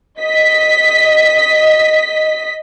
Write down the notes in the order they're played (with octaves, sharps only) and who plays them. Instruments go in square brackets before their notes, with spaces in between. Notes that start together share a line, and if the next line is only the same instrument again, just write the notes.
[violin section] D#5 B6